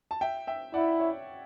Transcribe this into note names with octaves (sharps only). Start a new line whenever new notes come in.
A5
E5 G5
E5 G5
E4 D5 F#5
C#5 E5